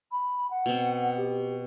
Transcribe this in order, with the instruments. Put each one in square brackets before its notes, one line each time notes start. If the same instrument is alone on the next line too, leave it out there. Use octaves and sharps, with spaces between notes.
[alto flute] B5
F#5
[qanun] B2 C4
[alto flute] G4